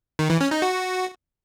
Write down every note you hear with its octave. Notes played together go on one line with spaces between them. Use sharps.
D#3
E3
C#4
D#4
F#4